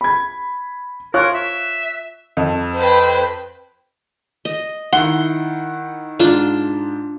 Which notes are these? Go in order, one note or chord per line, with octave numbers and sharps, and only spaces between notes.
B5 G#6
F4 A#4 C#5 F#6
E5
F2
B4 C5 G5
D#5
D#3 E4 F#5 C6
G#2 D4 F4